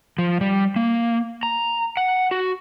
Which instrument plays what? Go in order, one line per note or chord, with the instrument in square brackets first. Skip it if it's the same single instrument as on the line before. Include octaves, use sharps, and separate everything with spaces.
[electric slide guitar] F3
G3
A#3
A#5
F#5
F#4